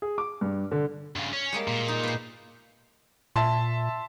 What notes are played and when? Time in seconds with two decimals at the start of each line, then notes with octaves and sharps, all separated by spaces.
0.02 G#4
0.18 D6
0.41 G2
0.72 D3
1.16 G2 C#3
1.33 C#4
1.52 G3 G#3 A#3
1.68 A#2
1.88 D#4
2.03 B4 C5
3.36 A#2 E5 A5 C6